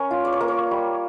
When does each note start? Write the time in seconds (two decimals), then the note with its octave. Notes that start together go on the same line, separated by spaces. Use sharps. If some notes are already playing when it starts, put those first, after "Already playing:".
Already playing: C#4 A#4 C#5
0.11 F4
0.25 D5
0.32 C#5
0.40 A#3 A#4
0.48 C#5
0.71 G3